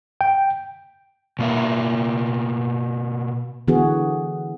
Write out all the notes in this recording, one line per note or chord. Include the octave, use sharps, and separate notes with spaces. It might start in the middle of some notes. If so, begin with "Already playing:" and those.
G5
B2 A#3 E5
D3 E3 B3 F#4 G#4